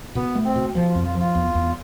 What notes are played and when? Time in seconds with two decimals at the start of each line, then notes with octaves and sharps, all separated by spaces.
0.15 B2 B3
0.35 A3
0.45 C4
0.56 B2
0.75 F3
0.90 F4
0.95 F2
1.04 F4
1.15 F3 F4
1.35 E2
1.54 E2